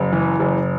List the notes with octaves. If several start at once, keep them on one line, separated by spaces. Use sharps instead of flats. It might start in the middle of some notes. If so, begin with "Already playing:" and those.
Already playing: F#1
E3
F#1